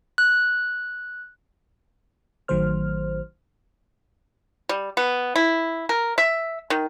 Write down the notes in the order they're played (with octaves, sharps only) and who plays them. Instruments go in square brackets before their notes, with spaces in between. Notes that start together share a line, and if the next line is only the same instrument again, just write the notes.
[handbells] F#6
[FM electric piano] A1 D#3 F#3 A3 C5 F6
[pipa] G3
B3
E4
A#4
E5
D#3